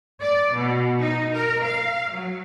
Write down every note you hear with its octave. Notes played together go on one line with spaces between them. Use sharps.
D5
B2
D#4
A#4
F5
F#3